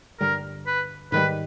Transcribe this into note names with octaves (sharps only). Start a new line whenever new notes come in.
G2 D3 G3 A#4
B4
G#2 D#3 G3 B4